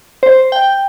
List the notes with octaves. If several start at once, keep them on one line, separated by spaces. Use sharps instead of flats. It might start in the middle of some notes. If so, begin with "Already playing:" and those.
C5
G5